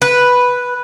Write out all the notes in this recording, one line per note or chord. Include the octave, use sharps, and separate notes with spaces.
B4